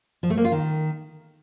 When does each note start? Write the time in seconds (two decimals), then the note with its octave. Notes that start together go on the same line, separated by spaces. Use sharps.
0.23 F3
0.30 A3
0.37 A#3
0.45 F4
0.52 D#3